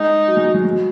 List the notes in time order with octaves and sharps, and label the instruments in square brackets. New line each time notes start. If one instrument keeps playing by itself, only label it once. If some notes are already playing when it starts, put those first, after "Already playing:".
Already playing: [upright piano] G#3 [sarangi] D#4
[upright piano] F#3
G#3
F#3
G#3
G#3
F#3